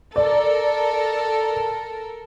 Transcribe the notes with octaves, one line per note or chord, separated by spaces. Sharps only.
A4 A#4 D5